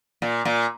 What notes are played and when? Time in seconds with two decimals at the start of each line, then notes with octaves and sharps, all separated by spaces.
0.22 A#2
0.45 A#2